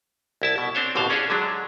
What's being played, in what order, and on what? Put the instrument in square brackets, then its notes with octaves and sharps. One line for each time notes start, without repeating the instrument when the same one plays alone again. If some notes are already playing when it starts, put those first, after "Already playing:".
[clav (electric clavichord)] C2 E4 A5
B2
C4 D4 C5 C#5
A1 B2 D3 C5 F5
C#4 D4 G#4 A4 C#5
D3 F#3 G#3 D4